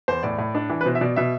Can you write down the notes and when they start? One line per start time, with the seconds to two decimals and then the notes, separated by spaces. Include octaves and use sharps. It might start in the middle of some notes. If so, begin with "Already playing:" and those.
0.08 E2 C5
0.23 A2 D5
0.38 A2
0.55 D4
0.70 E3
0.81 B4
0.86 B2 C5
0.95 E5
1.01 B2 D5
1.16 B2 E5